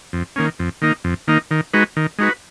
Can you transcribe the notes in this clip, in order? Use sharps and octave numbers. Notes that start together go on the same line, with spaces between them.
F2
D#3 A#3 C#4
F2
D#3 A#3 D#4
F2
D#3 A#3 D#4
D#3
G#3 D#4 F#4 B4
D#3
G#3 D#4 F#4 B4